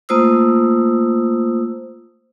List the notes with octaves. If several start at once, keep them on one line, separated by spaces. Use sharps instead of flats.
A3 A#3 F4 C5 D#6 E6